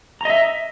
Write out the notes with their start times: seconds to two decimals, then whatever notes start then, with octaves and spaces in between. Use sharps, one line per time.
0.21 A#5
0.25 D#5
0.30 E5